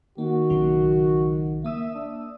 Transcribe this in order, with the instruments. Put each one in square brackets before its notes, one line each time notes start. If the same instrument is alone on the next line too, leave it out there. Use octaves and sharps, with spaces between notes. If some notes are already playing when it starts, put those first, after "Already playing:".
[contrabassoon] D#3 [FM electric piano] A#3 [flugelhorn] F#4
[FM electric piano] B1 C#3 F#3
[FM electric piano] A#3 D#6 E6 [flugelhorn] E5
[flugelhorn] D4